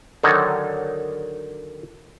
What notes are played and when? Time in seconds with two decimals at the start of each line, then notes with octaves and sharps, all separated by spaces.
0.23 D3 D#3 F#3 D#4 A4 C#5